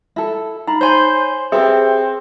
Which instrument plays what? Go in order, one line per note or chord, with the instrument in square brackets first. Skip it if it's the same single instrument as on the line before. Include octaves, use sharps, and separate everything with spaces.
[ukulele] E4 A4
[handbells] D#4 B5 [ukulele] A#5
[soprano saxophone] C5 [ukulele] C#5 G#5 [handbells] B5 C6 G6
[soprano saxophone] C4 [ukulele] G4 B4 E5 [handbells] G#4